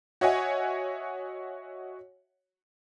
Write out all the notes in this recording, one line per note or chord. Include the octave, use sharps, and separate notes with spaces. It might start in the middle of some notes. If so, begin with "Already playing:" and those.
F#4 C#5 D#5 E5 F#5 G#5